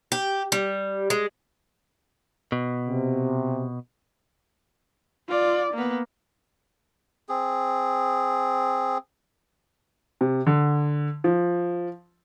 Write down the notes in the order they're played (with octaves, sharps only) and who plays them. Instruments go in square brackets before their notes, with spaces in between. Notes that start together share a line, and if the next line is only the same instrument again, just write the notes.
[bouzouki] G4
G3
G#3
[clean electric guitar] B2
[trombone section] C3
[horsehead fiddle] F4 D5
A#3 B3
[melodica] C4 G#4
[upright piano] C3
D3
F3